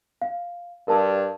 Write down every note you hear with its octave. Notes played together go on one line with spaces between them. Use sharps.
F5
G2 A#4 A5